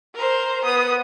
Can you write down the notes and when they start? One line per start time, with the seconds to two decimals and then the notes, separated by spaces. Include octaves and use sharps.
0.15 A#4 C5
0.64 B3 D#6